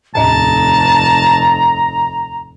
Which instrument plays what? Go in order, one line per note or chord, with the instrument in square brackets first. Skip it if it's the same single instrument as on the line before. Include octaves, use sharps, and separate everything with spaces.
[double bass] F1 [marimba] D#2 A2 [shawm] A5 [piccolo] A#5